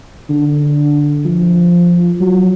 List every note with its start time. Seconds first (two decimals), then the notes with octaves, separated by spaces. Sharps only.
0.30 D3
1.25 F3
2.20 F#3